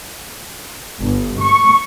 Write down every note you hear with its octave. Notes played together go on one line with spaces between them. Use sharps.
G1
C#6